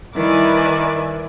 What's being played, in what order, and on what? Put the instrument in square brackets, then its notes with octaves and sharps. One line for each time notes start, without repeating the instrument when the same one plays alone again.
[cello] D#3 [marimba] G3 E4 [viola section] B4 E5 G#5 [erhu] D5